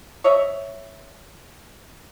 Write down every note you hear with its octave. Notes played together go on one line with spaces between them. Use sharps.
C#5 D#5 E5